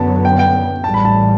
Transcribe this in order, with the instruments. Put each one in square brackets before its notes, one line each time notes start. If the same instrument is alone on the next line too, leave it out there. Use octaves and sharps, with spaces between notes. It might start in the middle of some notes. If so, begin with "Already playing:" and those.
Already playing: [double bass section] F#2 D3 F#3 B3 [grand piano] A5
[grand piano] G5
G5
[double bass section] A1 A2 E3 G3 [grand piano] A5
[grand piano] B5
A5